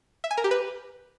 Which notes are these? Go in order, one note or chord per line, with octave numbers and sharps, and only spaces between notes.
E5
G#5
A#4
G4
B4